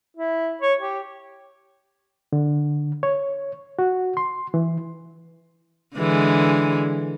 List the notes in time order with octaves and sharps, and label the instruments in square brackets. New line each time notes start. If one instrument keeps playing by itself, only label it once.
[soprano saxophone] E4
C#5
G4
[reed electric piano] D3
C#5
F#4
C6
E3
[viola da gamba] D3 E3 G#3